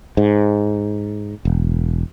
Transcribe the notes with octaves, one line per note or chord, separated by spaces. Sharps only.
G#2
E1